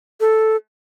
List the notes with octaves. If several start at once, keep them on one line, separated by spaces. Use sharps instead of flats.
A4